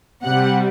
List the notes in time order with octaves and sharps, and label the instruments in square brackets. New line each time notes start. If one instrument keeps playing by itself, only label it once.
[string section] C3 G3 F#5